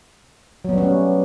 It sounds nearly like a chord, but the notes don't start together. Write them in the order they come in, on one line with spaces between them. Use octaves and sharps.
F#3 B3 G3 C#4 A3